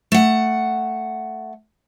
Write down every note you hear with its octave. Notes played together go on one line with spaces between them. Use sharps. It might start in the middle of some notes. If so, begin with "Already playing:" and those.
A3 F#5